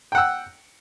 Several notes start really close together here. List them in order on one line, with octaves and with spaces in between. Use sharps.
G5 F#5 E6